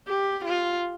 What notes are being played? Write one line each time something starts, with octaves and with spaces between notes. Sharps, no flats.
G4
F4